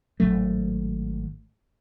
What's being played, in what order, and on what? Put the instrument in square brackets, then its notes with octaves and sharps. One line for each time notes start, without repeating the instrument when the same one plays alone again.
[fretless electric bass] G#1 A2 F#3 A3